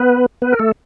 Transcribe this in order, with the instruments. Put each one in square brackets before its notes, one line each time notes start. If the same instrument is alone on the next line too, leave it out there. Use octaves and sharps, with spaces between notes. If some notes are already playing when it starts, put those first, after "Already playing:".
Already playing: [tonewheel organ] B3 B4
B3 B4
A#4
A3 A4